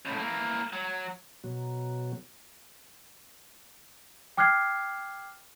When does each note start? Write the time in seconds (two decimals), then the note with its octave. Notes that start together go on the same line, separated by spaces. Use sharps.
0.05 C#2 A2
0.19 E3 A#3
0.73 F#3
1.44 B2 F#3
4.37 G5 D6 F6 F#6 G#6 C7